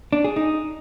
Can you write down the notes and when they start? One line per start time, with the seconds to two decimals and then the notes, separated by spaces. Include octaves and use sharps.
0.13 D4
0.24 G#4
0.36 D#4